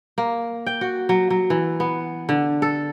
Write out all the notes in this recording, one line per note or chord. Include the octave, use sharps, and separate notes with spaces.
A#3
G5
F#4
F#3
F#3
E3
B3
D3
A4